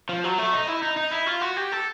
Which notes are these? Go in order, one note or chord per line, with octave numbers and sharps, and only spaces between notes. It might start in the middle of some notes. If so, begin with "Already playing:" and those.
F3
F#3
A3
D#4
E4
D#4
D#4
E4
F4
F#4
G4
A4